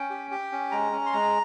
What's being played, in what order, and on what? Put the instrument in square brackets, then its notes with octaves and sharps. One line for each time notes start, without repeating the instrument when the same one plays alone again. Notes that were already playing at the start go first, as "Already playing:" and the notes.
Already playing: [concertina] C#4 G5
G4
G4
C#4
G#3 A#5
C#4
C6
G#3 A#5